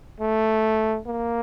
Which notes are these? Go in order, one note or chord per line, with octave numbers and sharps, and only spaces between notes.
A3
A#3